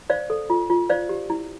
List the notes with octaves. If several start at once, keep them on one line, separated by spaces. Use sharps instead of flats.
C5 D5 F5
A4
F4
F4
C5 D5 F5
G4
E4